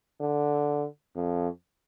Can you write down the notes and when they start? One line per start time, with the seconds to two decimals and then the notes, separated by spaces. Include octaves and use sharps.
0.20 D3
1.15 F2